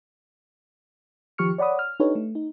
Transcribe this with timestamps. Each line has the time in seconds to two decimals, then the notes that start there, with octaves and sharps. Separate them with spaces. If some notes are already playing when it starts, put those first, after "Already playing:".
1.38 D#3 F3 G4 C#6 F6 C#7
1.58 C#5 D5 F#5 B5 D#6
1.79 F6
2.00 D4 D#4 G4 A4 B4 C#5
2.15 A3
2.35 D#4